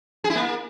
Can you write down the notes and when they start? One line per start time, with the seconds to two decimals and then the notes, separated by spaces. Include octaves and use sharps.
0.24 G#4
0.30 E4
0.35 A#3